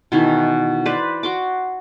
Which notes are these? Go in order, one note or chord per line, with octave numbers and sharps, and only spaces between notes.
B2 D#3 E3 A4
B4 C5 D5
F#4 C6 D6